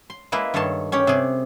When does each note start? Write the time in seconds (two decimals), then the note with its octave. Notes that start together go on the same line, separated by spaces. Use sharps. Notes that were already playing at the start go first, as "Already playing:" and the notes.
0.10 C6
0.32 G#3 A#3 E4 A#4 B4
0.54 G2 D#3 A4 C#5 A5 C6
0.92 C#4 G4 C#5
1.07 C3 G#4